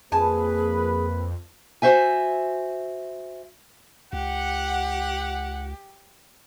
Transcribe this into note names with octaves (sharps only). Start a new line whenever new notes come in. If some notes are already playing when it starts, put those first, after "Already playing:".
F2 A#3 G#4 B4 G#5 A5
F#4 C5 E5 G#5
C#2 G4 F#5